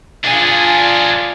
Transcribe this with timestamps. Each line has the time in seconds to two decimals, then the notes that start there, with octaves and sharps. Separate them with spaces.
0.24 D4 F4 G#4 G#5